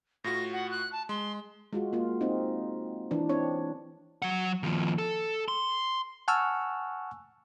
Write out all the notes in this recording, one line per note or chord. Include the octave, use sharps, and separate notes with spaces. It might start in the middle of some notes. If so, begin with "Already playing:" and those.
A2 F4 F#4 A#6
F#5
F#6
A5
G#3 C6
G#3 F4 F#4
A#3 F4
C4 D#4
E3 D4
C4 D4 C#5
F#3 F#5
D#2 F3
A4
C6
F#5 G#5 A5 C#6 E6 F6